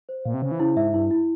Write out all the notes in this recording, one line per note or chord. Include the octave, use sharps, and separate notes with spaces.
C5
A#2 F5
C3
C#3 C5
E3
C#3 E4
G#2 E5
G2 E4
E4